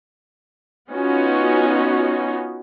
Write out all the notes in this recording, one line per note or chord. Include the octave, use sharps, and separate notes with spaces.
B3 C#4 D#4 F4 F#4